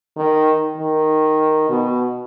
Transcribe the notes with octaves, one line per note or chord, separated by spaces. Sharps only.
D#3
D#3
B2